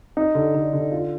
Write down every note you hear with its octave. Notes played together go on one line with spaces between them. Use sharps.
D#4
D3
D3
D3
F4